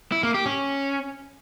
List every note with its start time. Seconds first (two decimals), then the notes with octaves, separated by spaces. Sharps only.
0.12 E4
0.23 A#3
0.34 G4
0.46 C#4